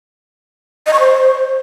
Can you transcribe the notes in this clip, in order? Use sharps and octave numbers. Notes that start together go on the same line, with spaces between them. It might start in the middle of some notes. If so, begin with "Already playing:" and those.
D#5
C#6
C5